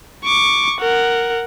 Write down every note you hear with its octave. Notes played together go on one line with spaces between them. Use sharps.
C#6 D6
A#4 F#5